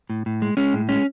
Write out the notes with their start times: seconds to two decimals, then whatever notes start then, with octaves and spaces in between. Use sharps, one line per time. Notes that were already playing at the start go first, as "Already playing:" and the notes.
0.10 A2
0.26 A2
0.42 G#3
0.57 G#3 C#4
0.73 A2
0.89 G#3 C#4